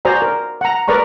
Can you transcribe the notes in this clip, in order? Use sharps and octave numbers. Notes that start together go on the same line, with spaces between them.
F#4 C5 D5 G#5 A#5
A#4
F#5 A#5
A#4 B4 D5 A#5 C#6